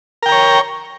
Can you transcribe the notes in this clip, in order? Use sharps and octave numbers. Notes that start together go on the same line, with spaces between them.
A#4 C#5 G5 A#5